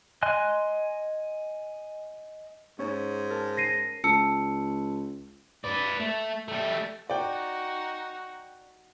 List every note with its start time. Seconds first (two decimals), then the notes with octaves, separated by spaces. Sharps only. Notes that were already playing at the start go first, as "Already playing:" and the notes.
0.23 D#5 G#5 C6 F#6
2.79 G#2 C#4
3.30 A#4 A5
3.57 A#6 C7 D#7
4.04 C#2 A5 E6 C#7
5.64 B4 D5
6.00 A3
6.48 G3 A3
7.10 D#4 F#4 D5 G5